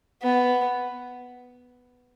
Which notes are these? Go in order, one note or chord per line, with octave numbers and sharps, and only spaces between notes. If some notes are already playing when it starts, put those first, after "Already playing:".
B3